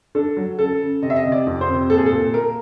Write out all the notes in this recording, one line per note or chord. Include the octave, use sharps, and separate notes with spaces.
D4 A4
F#3
C#3 A4
C#3
C3 D#5
E5
D#5
C3
D5
F2
C5
C3
A#2 A4
G#4
A4
A#2
A#3 A#4